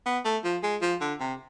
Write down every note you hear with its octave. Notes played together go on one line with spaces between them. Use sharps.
B3
A3
F3
G#3
F3
D3
C3